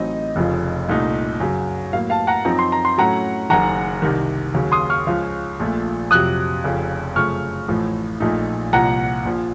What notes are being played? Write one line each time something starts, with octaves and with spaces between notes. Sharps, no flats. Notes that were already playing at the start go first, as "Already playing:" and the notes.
Already playing: A1 A2 F#3 C4 D#4 D#5
F1 F2 C#3 F3
C2 A#2 A3 D#4
F#2 C#3 F#3
A2 F#3 A#3 F5
F5 A5
F#5 A#5
F#2 F3 C4 D#4 A#5
C6
A#5
C6
A2 F#3 A3 C#4 F#5 A#5
F#1 F#2 D#3 F#5 A#5
C2 C3 D#3
D#2 C#3 F#3
C6 D#6
C#6 F6
C#2 C#3 F3
A#1 A#2 A3
F2 C3 F#3 D#6 F#6
F1 F2 C#3
F#2 C#3 F3 A3 C#6 F6
A1 A2 F3 A3
A#1 A#2 A3 D#4
C2 A#2 F3 F#5 A#5
A#1 A#2 F3